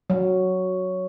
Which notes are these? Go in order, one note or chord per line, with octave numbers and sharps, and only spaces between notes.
F#3